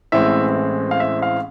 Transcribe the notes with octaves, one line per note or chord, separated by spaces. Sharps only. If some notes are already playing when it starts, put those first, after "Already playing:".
A1 A2 E3 G#3 C4 E5
F5
E5
F5